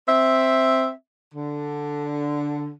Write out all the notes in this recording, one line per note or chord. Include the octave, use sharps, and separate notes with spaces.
C4 E5
D3